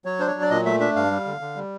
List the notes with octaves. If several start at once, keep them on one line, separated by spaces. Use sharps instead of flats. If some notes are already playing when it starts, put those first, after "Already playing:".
F#3 C#5
D4 C5
C#5
F#3
D5
A#2 D#5
A3 E5
D4 E5
G2 F5
G3
D3
D3
G3